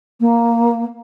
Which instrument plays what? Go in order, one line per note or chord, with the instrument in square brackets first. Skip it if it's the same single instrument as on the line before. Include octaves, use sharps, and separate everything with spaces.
[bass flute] A#3